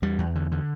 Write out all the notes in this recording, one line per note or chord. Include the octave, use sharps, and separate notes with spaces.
E2 G3
E2
D3
D3